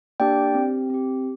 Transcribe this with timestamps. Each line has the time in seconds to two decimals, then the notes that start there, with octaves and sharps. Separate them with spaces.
0.20 A#3 D4 G4 D5 G5
0.55 C4 G4
0.90 C4 G4